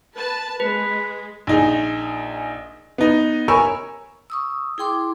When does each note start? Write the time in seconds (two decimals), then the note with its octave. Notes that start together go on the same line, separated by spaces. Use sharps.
0.15 B4 A5
0.60 G#3 B4 B5
1.47 A#1 D#4 G#4
2.98 B3 D#4
3.48 A#4 C#5 G#5 B5 C#6 E6
4.30 C#6 D#6 E6
4.78 E4 G#4 G5 C6 D6